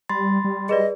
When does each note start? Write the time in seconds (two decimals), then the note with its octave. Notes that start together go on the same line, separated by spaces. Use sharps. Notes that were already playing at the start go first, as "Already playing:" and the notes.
0.09 G3 B5 C6 A6
0.44 G3
0.69 G#4 B4 D5 D#5